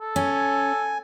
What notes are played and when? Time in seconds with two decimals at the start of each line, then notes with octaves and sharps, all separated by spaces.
0.01 A4
0.16 C#4 G#5